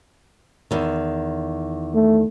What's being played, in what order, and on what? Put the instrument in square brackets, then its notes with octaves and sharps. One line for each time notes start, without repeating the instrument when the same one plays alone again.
[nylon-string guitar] E2 D#3
[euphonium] A3